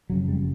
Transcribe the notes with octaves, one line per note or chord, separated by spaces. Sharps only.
F#1 F2 C#3 F#3
G3